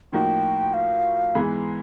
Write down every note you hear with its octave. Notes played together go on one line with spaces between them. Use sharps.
A2 F3 A#3 D#4 F#4 G5
F5
G#2 E3 G#3 B3